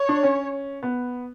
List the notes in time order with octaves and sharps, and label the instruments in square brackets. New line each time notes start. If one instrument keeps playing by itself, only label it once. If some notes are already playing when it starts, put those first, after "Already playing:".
Already playing: [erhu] C#5
[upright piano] D4
C#4
B3